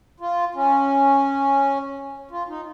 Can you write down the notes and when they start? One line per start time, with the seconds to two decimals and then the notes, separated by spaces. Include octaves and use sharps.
0.20 F4
0.55 C#4
2.31 F4
2.49 D#4